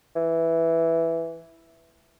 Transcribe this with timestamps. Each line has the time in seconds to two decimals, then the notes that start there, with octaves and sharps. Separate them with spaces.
0.16 E3